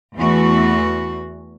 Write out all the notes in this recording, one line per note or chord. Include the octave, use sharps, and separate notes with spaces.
E2 E3 A3 F#4